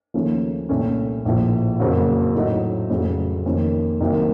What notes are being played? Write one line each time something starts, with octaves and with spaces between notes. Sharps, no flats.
D#2 C#3 F3 A3 C#4
C2 A#2 A3 C#4
A#1 A2 F3
F#1 F2 C#3 F#3 A#3
A2 F#3 A3 D#4
F1 F2 C#3 F#3 A3
F2 D#3 A#3 C#4
C2 C3 D#3 F#3 A#3